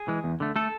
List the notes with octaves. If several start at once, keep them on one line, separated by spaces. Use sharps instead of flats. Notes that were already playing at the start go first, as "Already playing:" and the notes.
Already playing: G#4
E3 G#3
E2
D3 A3
A3 A4